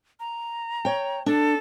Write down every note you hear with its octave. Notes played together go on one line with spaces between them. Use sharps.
A#5
C#5 G5
D4 A4